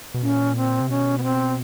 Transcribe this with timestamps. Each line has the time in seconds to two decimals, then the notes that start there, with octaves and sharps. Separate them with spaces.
0.14 B2
0.22 A#2 C#4
0.56 C4
0.80 C3
0.90 B2 C#4
1.18 B3
1.24 C4